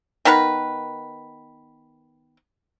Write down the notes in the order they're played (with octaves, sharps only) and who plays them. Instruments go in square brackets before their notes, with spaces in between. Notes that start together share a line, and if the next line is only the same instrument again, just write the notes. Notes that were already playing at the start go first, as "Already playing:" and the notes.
[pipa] D#3 B3 A#4 B4